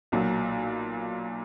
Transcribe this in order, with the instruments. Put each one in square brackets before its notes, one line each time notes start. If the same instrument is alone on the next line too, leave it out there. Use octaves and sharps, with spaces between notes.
[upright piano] B1 A#2 F#3